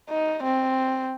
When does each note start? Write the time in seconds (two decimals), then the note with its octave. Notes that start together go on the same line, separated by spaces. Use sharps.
0.10 D#4
0.44 C4